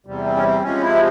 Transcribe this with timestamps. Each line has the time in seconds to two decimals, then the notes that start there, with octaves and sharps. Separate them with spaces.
0.06 E2 C3 G3
0.25 C4
0.36 C#4
0.44 C4
0.62 C3 F3 G#3 C#4
0.81 E4
0.95 C4